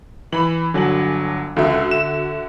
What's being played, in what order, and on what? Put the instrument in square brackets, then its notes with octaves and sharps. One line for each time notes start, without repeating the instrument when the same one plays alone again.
[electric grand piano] E3 [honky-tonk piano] B5 F#7
[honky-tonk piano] G1 G#5 F#7 [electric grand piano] D3 F#3
[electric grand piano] C#2 [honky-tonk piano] D3 F#4 E5
[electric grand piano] E7